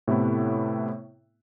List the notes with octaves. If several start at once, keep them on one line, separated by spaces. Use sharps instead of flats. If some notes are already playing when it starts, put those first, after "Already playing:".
A2 C3 A3 B3 E4